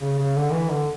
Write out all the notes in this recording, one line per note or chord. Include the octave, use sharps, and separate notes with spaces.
C#3
C#3
D3
E3
D3